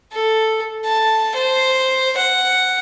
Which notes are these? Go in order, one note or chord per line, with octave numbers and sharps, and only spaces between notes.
A4
A5
C5
F#5